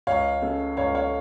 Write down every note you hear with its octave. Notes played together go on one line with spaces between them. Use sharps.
C#2 C#5 F5
C#3 A3
C#2 C#5 F5
C#5 F5